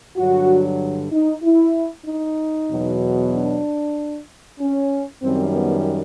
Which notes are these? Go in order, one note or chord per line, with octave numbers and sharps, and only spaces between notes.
G2 D3 F#3 F#4
D#4
E4
D#4
E2 B2 F#3
D4
C#4
F#2 D#3 G3 C4
B3